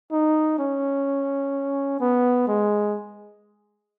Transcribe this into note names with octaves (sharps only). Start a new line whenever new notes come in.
D#4
C#4
B3
G#3